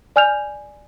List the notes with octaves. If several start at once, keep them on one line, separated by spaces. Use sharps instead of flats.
D5 G#5 F6 G6 F7